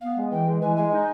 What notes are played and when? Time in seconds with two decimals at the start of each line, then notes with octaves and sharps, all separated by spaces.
0.01 B3 F5
0.17 G#3
0.31 E3 G5
0.46 G#3
0.61 E3 G#5
0.76 G#3 G#5
0.92 D#4